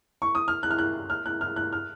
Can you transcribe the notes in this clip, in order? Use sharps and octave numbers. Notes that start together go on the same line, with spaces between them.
C#6
D#6
F6
F#6
F6
F#6
F6
F#6
F6
F#6
F6